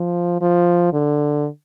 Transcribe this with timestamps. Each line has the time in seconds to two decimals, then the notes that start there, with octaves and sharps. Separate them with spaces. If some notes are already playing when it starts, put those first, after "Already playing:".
Already playing: F3
0.41 F3
0.93 D3